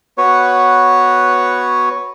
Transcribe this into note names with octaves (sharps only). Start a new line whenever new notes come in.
B3 F#4 B4 C#5